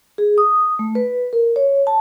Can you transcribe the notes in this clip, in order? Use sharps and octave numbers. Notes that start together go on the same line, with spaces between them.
G#4
D#6
A3
B4
A#4
C#5
A5